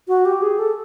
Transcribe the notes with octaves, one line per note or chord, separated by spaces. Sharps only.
F#4
G4
G#4
A4